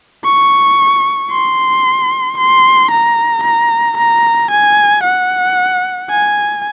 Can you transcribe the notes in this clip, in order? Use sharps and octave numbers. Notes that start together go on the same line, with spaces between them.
C#6
C6
C6
A#5
A#5
A#5
G#5
F#5
G#5